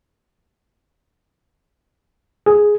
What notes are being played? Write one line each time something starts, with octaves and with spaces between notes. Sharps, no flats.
G#4